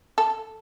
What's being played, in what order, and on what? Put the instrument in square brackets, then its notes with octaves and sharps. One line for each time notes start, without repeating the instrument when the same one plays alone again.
[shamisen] A4